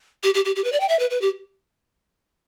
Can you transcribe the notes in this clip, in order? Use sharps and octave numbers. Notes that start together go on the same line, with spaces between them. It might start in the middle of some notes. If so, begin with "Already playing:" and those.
G4
G4
G4
G4
B4
D5
G5
E5
B4
B4
G4